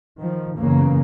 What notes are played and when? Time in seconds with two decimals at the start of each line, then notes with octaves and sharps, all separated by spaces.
0.20 D#3 F3
0.58 F#1 E2 C#3 E3 A#3